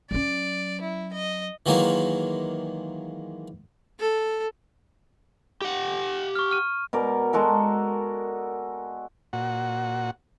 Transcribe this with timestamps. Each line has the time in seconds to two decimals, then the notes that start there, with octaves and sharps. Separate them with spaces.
0.11 F#3 C#4 D5
0.81 E4
1.14 D#5
1.66 D#3 E3 F#3 G#3 A#3
4.00 A4
5.62 G4 F#5
6.35 C#6 F6
6.51 F6 D#7
6.93 B2 A#4 D5
7.33 G#3 F#4 A4 A#4
9.33 A#2 F#4 F#5